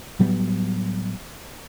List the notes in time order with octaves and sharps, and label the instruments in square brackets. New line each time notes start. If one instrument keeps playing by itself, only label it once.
[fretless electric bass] A2 F#3 G3 B3